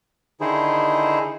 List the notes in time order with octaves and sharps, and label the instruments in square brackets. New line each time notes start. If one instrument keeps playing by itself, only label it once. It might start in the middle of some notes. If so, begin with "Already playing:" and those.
[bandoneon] D3 D#3 D#4 E4 G#4 C5